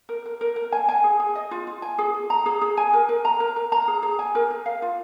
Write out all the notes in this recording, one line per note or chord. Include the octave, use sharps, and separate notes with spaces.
A#4
A#4
A#4
A#4
G#5
G#5
G#4
G#4
D#5
F4
F4
G#5
G#4
G#4
A#5
G#4
G#4
G#5
A#4
A#4
A#5
A#4
A#4
A#5
G#4
G#4
G#5
A#4
A#4
F5
F4